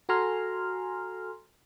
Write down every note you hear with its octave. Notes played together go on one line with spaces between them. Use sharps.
F#4 A4 G#5 A#5 C6 F6